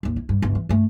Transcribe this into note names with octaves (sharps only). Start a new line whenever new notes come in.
A1 D#2
E4
G2
G1 C#2
E3
G2 A3